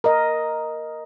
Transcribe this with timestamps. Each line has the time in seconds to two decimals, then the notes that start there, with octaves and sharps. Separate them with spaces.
0.04 A#4 D#5